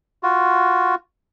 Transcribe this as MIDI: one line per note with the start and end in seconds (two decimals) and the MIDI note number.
0.23 0.95 65
0.23 0.95 66